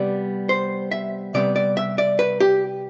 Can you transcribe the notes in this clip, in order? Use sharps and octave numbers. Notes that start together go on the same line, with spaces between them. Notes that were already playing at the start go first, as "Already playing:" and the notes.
Already playing: C3 G3 B3 D5
C5
E5
C3 G3 B3 D5
D5
E5
D5
B4
G4